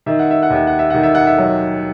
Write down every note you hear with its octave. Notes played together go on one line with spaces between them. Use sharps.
D#3 E5
F#5
E5
F#5
D#2 E5
F#5
E5
D#3 F#5
E5
F#5
E5
F#3